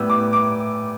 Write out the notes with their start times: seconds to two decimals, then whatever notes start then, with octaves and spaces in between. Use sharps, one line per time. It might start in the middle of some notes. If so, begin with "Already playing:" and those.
Already playing: A2 G3 B3 E6
0.10 D6
0.33 D6